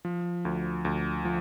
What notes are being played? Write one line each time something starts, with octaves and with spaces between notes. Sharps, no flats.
F3
D2
D2
F3